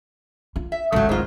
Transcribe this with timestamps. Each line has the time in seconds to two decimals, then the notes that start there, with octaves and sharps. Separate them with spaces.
0.56 F4
0.72 E5
0.92 D1 G#1 C#3 F#3 A3
1.09 G#2 F#3 F4